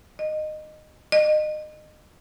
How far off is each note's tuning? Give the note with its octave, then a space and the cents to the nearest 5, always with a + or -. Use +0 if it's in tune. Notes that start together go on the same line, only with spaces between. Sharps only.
D#5 -20
D#5 -30